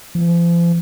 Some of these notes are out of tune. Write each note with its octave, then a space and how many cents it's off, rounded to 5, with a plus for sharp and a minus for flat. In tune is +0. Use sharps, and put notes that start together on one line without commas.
F3 -40